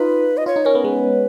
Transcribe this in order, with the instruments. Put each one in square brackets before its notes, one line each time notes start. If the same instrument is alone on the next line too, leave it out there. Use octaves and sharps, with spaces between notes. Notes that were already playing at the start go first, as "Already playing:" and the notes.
Already playing: [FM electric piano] D#4 F4 [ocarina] B4
[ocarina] D#5
[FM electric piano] F4 [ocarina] C#5
[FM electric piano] D#4
[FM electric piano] C#4 [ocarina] A#4
[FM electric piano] B3
[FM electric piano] G#3 [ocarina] B4